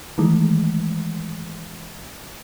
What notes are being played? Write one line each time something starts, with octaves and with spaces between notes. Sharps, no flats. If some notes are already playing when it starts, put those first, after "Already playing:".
D#3 E3 G#3 A3